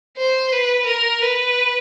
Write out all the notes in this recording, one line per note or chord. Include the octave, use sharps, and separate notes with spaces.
C5
B4
A#4
B4